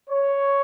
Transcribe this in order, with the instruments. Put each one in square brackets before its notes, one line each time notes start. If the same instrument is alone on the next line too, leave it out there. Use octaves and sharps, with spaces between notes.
[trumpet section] C#5